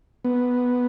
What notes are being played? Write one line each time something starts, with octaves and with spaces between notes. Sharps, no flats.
B3